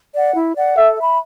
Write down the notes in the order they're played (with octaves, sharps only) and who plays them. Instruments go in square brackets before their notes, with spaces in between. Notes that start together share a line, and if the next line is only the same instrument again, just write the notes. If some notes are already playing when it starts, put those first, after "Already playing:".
[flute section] D5 F#5
E4
D5 F#5
[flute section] A4 [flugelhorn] E5
[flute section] E5 B5